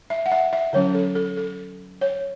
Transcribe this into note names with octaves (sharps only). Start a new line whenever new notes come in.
E5
F#5
E5
E5
D3 F#3 C#4 C#5
A4
A4
A4
C#5